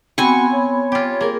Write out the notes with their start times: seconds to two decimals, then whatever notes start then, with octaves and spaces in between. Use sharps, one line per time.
0.18 B3 C4 F#4 G#5 B5 C#6
0.51 C#5
0.92 F4 G4
1.21 A#3 G#4 A#4